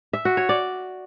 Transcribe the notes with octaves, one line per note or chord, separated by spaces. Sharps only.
E5
F#4
C#5
D5